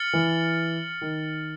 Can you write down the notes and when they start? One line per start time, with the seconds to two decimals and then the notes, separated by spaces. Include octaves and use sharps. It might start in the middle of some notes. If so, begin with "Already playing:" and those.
Already playing: F6 A6 C#7 F#7
0.13 E3
1.02 D#3